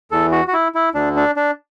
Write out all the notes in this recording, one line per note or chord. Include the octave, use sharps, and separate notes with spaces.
E2 E3 A4
F#4
F#4
E4
E4
D2 D3 D4
D4
D4